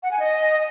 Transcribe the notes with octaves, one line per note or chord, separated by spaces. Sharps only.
F#5
G#5
D#5